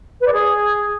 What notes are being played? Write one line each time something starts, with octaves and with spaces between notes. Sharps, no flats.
B4
D5
G#4